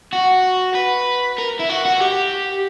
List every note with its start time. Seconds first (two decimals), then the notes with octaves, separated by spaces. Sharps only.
0.13 F#4
0.75 B4
1.38 A#4
1.59 E4
1.69 F#4
1.85 F#4
2.00 G4